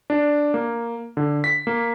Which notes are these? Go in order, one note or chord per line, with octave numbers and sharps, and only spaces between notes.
D4
A#3
D3
B6
A#3